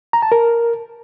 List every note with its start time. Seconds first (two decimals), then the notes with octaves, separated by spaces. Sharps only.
0.13 A#5
0.22 A5
0.32 A#4